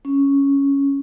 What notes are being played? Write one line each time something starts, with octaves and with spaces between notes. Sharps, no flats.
C#4